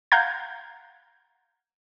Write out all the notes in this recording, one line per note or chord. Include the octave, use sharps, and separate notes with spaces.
F5 F#5 A#5 G6 G#6